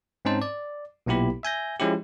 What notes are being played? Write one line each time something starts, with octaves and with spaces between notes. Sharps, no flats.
G#2 C4 C#4 D#4 C5 A5
D5
B1 A#2 B3 E4 G4 B5
E5 G#5 G6 A#6
F3 G#3 C#4 E4 G4